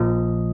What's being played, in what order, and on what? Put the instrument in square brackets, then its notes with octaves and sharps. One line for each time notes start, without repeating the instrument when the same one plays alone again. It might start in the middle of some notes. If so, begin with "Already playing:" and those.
Already playing: [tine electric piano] A#1 A#2 F3 D#5